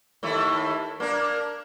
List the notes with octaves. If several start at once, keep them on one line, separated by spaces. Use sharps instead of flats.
D#2 A3 E4
A#3 D4 A#4